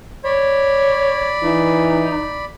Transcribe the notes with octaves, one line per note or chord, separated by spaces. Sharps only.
C#5 D5 B5
E3 D#4